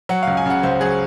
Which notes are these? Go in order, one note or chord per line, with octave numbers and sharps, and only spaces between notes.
F#3 F#5
C#2 F5
G#5
C#3 F#5
C#2 C5
F#3 G#4